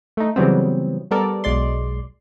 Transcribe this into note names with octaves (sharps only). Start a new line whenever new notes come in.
A3 D#4
C#3 E3 F#3 G3 B3 C4
G3 B3 A4 A#4 D5
B1 G#3 D5 C6